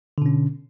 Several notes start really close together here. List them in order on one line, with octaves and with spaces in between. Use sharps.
D3 B2 C#4